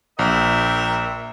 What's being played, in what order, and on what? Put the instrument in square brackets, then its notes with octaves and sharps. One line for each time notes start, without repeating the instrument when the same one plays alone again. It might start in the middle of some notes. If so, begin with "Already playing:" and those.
[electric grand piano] A#1 [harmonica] A#4 E5 G5